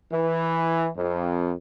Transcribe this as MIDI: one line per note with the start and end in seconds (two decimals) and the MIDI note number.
0.11 0.88 52
0.96 1.52 41